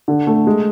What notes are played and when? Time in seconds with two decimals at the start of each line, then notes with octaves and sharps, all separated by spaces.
0.08 D3
0.27 A3
0.47 G#3